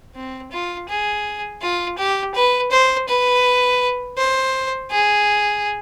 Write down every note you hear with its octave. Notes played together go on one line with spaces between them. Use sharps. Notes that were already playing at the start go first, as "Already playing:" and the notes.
C4
F4
G#4
F4
G4
B4
C5
B4
C5
G#4